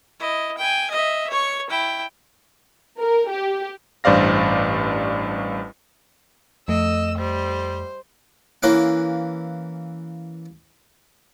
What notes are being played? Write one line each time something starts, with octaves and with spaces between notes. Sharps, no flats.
E4 D#5
G5 G#5
D#5 E5
C#5 C#6
E4 G5
A#4
G4
A1 G2 C5 D5 F5 A#6
F2 A3 D#5 E6
G3 C5
E3 A#3 C#4 F5 F#5